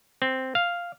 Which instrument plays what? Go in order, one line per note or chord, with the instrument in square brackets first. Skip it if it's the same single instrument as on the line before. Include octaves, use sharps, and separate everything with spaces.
[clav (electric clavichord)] C4
F5